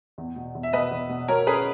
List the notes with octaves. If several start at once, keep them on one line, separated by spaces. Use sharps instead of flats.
E2
B2
E2
E5
B2 B4 D#5
E2
B2
F#3 A#4 C#5
C#4 G#4 B4